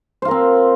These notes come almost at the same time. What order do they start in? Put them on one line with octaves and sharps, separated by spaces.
C5 F4 A#4 C4